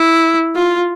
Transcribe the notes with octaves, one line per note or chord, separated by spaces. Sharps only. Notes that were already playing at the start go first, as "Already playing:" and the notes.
Already playing: E4
F4